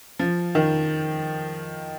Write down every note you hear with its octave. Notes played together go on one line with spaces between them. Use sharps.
F3
D#3